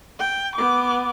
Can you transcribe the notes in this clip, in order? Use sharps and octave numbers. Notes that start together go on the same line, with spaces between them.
G5
B3 D6